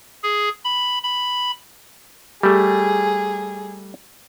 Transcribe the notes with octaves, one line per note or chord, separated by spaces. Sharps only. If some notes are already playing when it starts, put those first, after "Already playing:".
G#4
B5
B5
G3 A3 G4 G#4